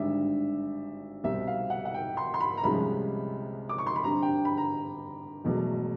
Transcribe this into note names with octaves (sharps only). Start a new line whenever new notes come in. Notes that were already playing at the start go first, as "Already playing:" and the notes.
Already playing: G#1 G2 D3 G3 E5
C2 B2 G3 C4 E5
F5
F#5
F#5
G5
C6
C6
B5
A#5
C2 C3 F3 G#3 C#4 B5
D6
C#6
C6
B5
G2 D3 G3 C4 A#5
G5
B5
A#5
E1 E2 B2 F#3 A3